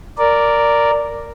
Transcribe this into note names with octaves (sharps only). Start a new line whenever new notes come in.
A#4 D5